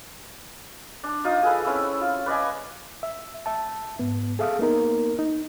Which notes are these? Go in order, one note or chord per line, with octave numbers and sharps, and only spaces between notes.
D4
D#4 F4 D#5 D#6
G#4 A4 B4
C4 C#4 E4 E6
F4
B4 D5 D#5 G#5
E5
E5 A5
G#2 B3
G#4 A4 E5 F5 D#6
A#3 B3 D#4 A#4
D#4